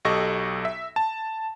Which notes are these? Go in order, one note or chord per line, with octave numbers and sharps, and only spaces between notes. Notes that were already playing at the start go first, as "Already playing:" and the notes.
B1 G4 A4 D#5 C#6 A#6
E5
A5